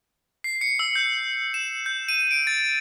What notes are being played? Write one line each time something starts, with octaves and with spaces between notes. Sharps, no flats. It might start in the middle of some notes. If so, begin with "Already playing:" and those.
C7
C#7
E6
G6
E7
G6
D#7
D7
A6